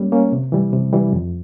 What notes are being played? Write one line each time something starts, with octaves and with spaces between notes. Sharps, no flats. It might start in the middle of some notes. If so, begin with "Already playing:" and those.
Already playing: G3 A#3 C#4
A#3 C#4
C3
E3 G3
C3
E3 G3
F2